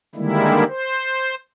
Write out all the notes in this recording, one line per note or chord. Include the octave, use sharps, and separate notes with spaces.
D3 D#3 G3 G#3 A#3 E4
C5